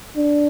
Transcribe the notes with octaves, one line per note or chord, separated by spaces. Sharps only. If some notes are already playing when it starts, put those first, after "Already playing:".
D4